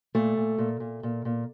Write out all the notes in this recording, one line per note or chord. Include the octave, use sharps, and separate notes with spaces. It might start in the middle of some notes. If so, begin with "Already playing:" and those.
A#2 A3
A#2
A#2
A#2
A#2
A#2